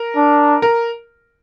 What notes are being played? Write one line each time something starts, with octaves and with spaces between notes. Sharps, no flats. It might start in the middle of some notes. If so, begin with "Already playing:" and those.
Already playing: A#4
D4
A#4